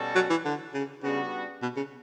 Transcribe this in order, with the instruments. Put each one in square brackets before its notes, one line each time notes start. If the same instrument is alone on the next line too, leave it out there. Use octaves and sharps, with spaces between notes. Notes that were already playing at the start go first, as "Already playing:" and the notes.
Already playing: [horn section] B2 G3 C#4 F#4 A4
[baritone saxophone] F#3
E3
D3
C#3
[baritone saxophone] C#3 [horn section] G3 B3 D4 F#4
[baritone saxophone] B2
C#3